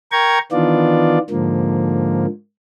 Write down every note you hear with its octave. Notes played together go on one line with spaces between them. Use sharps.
A#4 G5 A#5 C#6 G#6
D#3 E3 B3 D4 F4 D5
G#2 D3 F3 A#3